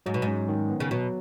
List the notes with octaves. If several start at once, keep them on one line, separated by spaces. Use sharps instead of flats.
G#2 F#3
B2
G#2
C#4
D#3
B3
C#3
B2 F#3